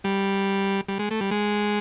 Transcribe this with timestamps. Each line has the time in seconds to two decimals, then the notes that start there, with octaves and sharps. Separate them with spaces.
0.04 G3
0.88 G3
0.99 G#3
1.11 A3
1.21 G3
1.31 G#3